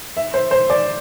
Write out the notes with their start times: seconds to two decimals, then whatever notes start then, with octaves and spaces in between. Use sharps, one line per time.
0.17 E5
0.34 C5
0.51 C5
0.70 D5